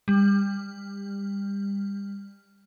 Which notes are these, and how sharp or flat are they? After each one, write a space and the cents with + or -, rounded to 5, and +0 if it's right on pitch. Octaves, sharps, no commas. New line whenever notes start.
G3 +25